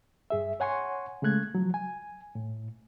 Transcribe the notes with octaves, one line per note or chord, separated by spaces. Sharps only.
G2 G#4 E5
C#5 F#5 G#5 C6 C#6
C#3 G#3 A3 F#6 G#6
F3 F#3
G#5
A2